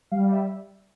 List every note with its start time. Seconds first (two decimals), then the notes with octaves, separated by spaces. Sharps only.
0.11 G3 F5
0.32 E5